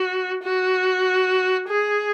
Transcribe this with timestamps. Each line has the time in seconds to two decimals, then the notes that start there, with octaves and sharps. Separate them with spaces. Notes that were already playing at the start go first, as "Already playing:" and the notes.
Already playing: F#4
0.44 F#4
1.68 G#4